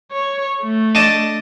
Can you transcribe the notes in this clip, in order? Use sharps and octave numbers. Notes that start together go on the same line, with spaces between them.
C#5
A3
D4 D#5 A5